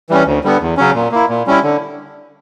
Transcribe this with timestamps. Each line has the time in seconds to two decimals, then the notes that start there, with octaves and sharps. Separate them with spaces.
0.10 E3 G3 C#4
0.26 D2
0.44 D3 G3 B3
0.61 E2
0.77 C#3 F#3 C#4
0.95 A#2
1.12 A#3 E4
1.29 A#2
1.47 G3 C#4 E4
1.63 D3